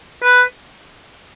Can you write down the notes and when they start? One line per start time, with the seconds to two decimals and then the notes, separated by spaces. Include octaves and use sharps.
0.23 B4